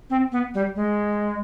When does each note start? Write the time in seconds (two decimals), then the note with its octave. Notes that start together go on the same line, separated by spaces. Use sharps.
0.10 C4
0.32 B3
0.54 G3
0.76 G#3